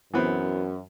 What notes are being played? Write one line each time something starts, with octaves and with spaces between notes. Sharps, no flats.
F#2 E3 B3 C4